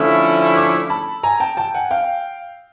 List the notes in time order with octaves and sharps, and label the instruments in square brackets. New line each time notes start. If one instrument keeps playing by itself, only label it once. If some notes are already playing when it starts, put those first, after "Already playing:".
Already playing: [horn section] D3 F3 A3 C#4 E4 [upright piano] D#6 F6
[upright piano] D6 E6
A5 B5
G#5 A#5
G5 A5
G5 A5
F#5 G#5
F5 G5